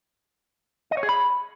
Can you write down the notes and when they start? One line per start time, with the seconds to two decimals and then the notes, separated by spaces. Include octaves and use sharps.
0.91 D#5
0.97 C#5
1.03 G#4
1.09 B5